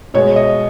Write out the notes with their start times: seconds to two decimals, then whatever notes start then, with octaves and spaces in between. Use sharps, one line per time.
0.14 B2 G#3 C#5
0.36 D#5